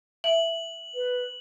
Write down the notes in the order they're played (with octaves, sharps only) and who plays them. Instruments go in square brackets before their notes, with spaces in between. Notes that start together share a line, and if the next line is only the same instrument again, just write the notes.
[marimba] E5 [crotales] F#7
[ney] B4